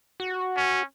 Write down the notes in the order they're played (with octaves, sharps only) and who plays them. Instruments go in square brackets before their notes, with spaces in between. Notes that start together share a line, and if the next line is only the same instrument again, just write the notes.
[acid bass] F#4
[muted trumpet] C#4